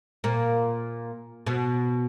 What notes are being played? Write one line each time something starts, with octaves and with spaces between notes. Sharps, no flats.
A#2 A#3
B2 B3